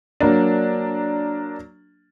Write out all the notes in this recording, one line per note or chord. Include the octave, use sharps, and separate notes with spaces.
F#3 A#3 D4